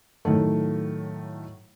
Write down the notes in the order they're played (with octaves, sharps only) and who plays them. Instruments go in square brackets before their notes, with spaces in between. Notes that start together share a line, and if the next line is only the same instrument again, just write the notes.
[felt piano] A2 D#3 F#3 A3